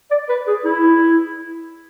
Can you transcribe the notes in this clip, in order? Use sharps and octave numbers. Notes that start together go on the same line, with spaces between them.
D5
B4
G#4
E4